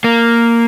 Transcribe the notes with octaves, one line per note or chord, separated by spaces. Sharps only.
A#3